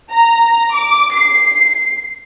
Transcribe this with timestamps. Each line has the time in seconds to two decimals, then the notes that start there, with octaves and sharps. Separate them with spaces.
0.10 A#5
0.73 D6
1.14 C7